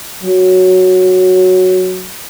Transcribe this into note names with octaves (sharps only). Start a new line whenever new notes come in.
F#3